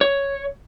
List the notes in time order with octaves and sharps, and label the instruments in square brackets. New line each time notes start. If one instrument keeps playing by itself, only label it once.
[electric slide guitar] C#5